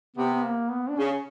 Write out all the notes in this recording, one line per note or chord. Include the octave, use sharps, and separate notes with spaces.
C3 B3
B3
A#3
B3
D4
C#3 C#4